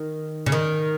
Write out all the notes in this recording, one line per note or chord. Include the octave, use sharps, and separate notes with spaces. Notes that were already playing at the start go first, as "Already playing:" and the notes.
Already playing: D#3
C#3
D#3